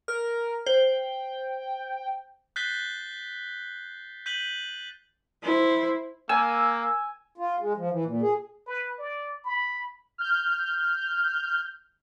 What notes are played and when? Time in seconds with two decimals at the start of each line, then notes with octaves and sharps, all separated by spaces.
0.08 A#4 F6
0.66 C5 G5
2.56 F#6 G6 A6 B6 C7 G7
4.26 G6 B6 D#7 F#7 G7
5.43 E4 C5
6.29 A#3 G#5 E6
7.38 F4
7.60 G#3
7.77 F3
7.91 E3
8.05 A#2
8.22 G#4
8.66 B4
8.99 D5
9.44 B5
10.18 F6 G6